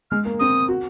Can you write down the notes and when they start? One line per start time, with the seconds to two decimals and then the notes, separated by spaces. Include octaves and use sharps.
0.11 G#3 F6
0.25 A#3
0.39 C4 D#6
0.69 F#4